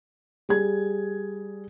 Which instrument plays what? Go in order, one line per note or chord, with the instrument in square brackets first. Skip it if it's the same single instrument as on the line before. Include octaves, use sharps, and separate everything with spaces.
[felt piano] G3 G#4 G#6